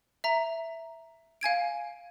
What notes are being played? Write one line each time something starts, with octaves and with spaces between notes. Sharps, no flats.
E5 A#5
F5 G#5 G#6 D7